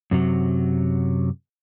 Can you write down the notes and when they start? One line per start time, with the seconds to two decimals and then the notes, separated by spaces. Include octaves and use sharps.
0.11 F#2 C3 F#3